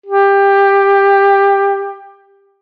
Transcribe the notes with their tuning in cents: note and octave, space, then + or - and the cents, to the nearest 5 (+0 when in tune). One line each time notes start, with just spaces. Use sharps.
G4 +15